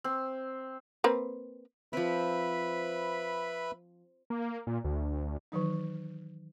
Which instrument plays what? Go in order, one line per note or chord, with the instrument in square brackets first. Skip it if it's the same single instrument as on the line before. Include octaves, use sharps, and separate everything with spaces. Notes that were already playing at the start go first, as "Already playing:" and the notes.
[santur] C4
[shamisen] A#3 C4 B4
[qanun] F3 C4 [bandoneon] B4 E5 B5
[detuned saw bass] A#3
A#2
D2
[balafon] D#3 E3 F#3 D#4